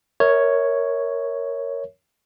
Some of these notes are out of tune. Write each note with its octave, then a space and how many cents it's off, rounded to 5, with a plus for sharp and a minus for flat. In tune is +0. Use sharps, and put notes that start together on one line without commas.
A#4 +0 C#5 +0 E5 -35